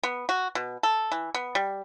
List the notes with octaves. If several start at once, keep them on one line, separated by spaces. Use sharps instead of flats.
B3
F#4
B2
A4
E3
B3
G3